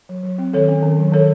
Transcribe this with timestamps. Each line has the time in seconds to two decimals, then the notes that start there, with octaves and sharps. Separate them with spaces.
0.09 F#3
0.23 F#3
0.38 C4
0.53 D#3 A4 C#5
0.69 C#4
0.83 D#3
0.99 F#3
1.12 D#3 A4 C#5